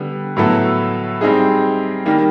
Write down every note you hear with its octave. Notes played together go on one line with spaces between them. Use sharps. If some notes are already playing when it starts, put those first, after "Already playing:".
Already playing: D3 G3 B3
A2 F#3 B3 E4 A4
G3 C4 D#4 G#4
D#3 G3 A#3